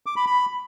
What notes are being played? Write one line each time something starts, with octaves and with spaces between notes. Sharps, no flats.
D6
B5
B5